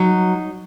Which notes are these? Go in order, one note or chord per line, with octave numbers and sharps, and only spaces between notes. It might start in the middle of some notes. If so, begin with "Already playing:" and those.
Already playing: F#3 D#4